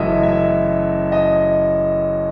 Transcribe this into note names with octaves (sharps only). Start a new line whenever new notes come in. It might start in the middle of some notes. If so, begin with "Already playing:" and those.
Already playing: F#1 F#2 E3 A3 D#5 E5
E5
D#5